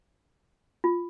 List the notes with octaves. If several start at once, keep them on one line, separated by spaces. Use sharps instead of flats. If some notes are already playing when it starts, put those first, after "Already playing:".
F4